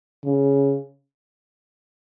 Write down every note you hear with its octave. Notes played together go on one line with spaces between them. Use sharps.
C#3